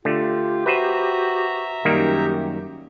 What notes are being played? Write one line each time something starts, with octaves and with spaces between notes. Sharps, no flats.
D3 A3 F4 G4
F#4 B4 C5 E5 A#5
F#2 D#3 G3 A#3 G4